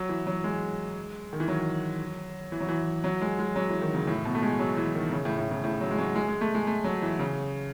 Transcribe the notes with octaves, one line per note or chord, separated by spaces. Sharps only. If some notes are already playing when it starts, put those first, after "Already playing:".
Already playing: F#3
E3
F#3
G#3
D#3
E3
F#3
E3
F#3
E3
F#3
G#3
G#3
F#3
E3
D#3
C#3
A2
B2
A3
G#3
F#3
E3
D#3
C#3
A2
A2
C#3
A2
F#3
G#3
F#3
G#3
G#3
A3
G#3
A3
F#3
E3
C#3